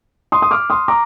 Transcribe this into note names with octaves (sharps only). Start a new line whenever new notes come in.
C6 D#6
D#6
D6 F6
C6 D#6
A#5 D6